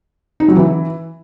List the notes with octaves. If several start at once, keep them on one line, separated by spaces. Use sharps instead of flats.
D#4
F#3
E3